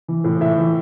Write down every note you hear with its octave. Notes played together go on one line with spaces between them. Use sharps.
E3
A2
A2 E5
E3